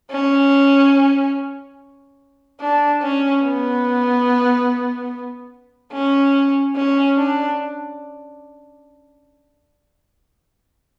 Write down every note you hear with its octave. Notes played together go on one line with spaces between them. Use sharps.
C#4
D4
C#4
B3
C#4
C#4
D4